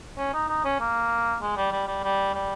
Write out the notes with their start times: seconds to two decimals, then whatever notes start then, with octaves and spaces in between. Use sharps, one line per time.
0.17 C#4
0.33 D#4
0.48 D#4
0.64 C#4
0.80 A#3
1.41 G#3
1.57 G3
1.72 G3
1.87 G3
2.04 G3
2.35 G3